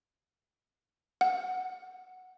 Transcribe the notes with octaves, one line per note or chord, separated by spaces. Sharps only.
F#5